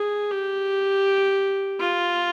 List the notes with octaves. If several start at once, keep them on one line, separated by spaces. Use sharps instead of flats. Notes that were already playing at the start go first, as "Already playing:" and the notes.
Already playing: G#4
G4
F4